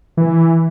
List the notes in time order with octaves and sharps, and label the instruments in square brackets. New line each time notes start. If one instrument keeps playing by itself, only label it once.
[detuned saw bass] E3